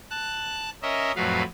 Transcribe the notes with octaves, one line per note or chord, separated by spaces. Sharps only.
A5 F#6
C#4 A#4 D#5 E5
F2 A2 F#3 B4 F5